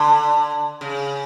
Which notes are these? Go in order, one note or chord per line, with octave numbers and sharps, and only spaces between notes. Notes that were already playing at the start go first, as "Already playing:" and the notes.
Already playing: D3
C#3